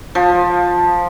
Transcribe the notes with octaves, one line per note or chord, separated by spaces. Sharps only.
F3